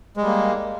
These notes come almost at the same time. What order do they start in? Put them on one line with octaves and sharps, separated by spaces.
G#3 G3 A#3